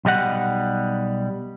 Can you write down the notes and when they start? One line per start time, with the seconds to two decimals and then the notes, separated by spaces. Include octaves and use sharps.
0.05 B1 G3 D#5 F#5